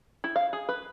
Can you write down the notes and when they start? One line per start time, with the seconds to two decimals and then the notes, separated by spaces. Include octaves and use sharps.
0.24 E4
0.36 F5
0.53 G#4
0.69 B4